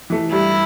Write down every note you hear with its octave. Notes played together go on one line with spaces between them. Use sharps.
E3 A3
G2 E4